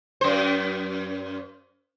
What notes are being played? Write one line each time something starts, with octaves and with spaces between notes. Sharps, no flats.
F#2 C5